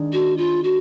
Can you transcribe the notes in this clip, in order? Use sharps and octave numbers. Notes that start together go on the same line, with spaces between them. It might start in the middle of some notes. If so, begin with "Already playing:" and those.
Already playing: D#3 G#3 D4
F#4
F4
F#4